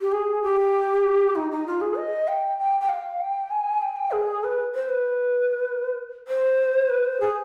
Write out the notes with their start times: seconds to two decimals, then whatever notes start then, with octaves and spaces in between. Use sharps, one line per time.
0.01 G4
0.12 G#4
0.43 G4
1.36 D#4
1.51 D#4
1.66 F4
1.81 G#4
1.97 D#5
2.28 G5
2.59 G5
2.80 G5
2.89 F5
3.20 G5
3.51 G#5
3.82 G5
3.89 G#5
3.96 G5
4.13 G#4
4.44 B4
4.75 C5
4.89 B4
6.28 C5
6.90 B4
7.05 C5
7.21 G#4